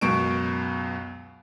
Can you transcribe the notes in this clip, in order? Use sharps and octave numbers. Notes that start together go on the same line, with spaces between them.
C#2 F#2 B2 C#6 D7